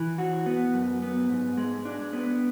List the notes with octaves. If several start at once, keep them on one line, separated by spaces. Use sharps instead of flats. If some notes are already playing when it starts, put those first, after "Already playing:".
Already playing: E3
F#4
B3
F#2
B3
G#2
G#3
D4
B3